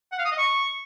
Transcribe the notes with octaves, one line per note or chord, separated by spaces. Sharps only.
F#5
F5
D#6
D#5
C#6